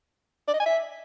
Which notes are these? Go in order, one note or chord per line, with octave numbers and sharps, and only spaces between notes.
D5
D#5
G#5
E5